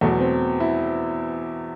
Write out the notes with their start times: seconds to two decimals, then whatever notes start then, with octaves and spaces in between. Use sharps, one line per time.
0.01 E2 B2 F#3 A3
0.20 C4
0.60 E4